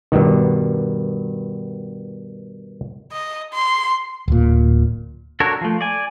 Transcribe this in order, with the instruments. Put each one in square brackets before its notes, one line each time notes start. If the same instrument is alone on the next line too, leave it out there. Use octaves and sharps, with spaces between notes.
[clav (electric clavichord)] G2 B2 D#3
[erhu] D#5
C6
[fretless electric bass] D1 A#2
[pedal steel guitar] D4 F#4 A4 A#4 C#5
F3 A3
D5 G#5